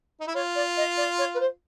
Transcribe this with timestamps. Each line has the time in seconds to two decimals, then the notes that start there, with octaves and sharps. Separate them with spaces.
0.20 D#4
0.27 E4
0.35 F4 C#5
0.56 D5
0.77 D#5
0.97 D5
1.19 C#5
1.34 B4
1.40 C5